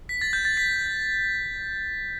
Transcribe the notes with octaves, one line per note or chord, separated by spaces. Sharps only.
B6
A6
G6
A6
B6